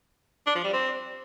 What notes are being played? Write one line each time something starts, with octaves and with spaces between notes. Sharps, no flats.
D4
F3
G3
C4